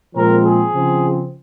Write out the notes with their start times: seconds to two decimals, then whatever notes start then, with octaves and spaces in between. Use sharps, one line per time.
0.15 A#2 F3 G#3 C4 A#4
0.45 G#4
0.75 C#3 F3 C4